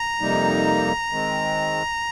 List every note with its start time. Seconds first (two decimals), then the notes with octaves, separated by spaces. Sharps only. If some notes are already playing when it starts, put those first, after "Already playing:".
Already playing: A#5
0.21 F2 C3 G3 A#3 D#4
1.11 D#3 G#3 C4